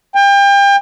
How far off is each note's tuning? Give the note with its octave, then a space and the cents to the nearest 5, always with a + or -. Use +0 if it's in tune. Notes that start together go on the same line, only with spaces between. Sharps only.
G5 +35